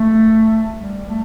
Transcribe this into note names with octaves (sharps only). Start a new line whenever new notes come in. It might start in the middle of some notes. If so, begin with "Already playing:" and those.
Already playing: A3
G3
A3